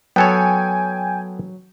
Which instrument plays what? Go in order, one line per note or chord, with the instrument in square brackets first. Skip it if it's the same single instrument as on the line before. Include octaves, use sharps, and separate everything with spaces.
[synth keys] F#3 [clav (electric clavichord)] B3 A4 C#5 [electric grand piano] G5 G#5